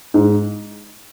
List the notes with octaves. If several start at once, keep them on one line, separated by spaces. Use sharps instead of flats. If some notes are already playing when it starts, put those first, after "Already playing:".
G#2